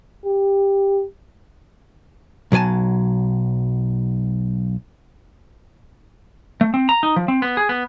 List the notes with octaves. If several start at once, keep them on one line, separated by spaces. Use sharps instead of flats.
G4
B1 F#3 C5 G#5 A5
A3
C4
A#5
D#4
F3
C4
B3
G#4
B3